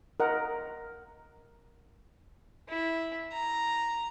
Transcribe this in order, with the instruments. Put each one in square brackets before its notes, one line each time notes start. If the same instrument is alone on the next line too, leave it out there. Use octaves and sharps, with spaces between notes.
[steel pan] A#4 D#5 F#5
[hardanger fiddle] E4
A#5